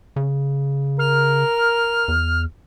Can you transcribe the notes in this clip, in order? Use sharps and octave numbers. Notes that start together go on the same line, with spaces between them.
C#3
A#4 F6
E2